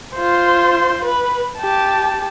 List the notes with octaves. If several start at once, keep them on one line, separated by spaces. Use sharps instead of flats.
F4 C5
B4
G4 A5